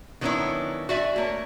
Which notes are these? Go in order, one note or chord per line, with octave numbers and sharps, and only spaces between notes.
D#3 F#3 B3 C#4 D4 E4
F#4 D5 E5 G#5
A3 A#3 C#5